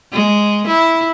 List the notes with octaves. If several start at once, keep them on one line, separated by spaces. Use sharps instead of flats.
G#3
E4